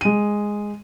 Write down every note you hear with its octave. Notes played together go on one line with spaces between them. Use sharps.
G#3 D#7